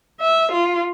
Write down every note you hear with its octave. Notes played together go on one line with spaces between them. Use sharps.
E5
F4